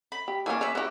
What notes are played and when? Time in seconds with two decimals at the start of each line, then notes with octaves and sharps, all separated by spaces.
0.12 B5
0.28 G4
0.46 E3 A#3 C#4 D4 G#5
0.61 C#4 B4 E5
0.75 C#3 E4 F#4 G4